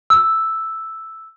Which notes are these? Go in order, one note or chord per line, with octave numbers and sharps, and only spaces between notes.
E6